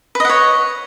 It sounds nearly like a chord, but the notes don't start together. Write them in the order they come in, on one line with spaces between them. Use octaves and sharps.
B4 D#5 F#5 C#5